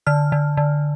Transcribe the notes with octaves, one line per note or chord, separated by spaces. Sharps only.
D3 F6
D3
D3